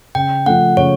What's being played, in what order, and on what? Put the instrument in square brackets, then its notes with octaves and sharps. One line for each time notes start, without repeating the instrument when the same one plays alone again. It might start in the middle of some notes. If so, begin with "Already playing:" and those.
[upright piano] C#3 [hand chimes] G5
[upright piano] F3 A3 [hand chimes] F#5
[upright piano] C#3 [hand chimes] C#5